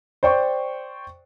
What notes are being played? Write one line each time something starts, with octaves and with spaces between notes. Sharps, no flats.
C5 D5 G5 C#6